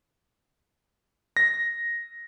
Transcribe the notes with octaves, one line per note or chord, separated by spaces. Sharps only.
A#6